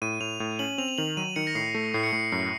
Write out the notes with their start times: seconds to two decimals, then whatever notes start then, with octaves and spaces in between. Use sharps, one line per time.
0.02 A2 D#7
0.20 A2 F7
0.40 A2 F7
0.59 C#4 F#7
0.78 C4 F7
0.88 F7
0.98 D#3 F#7
1.17 F#3 D#7
1.36 D#3 C#7
1.47 A#6
1.55 A2 C7
1.75 A3
1.94 A2 C7
2.03 C#7
2.13 A2 C7
2.32 F#2 C7